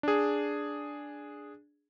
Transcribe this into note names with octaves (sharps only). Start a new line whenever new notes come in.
D4 G#4